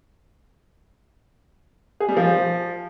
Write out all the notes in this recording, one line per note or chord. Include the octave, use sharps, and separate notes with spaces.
G#4
G3
F3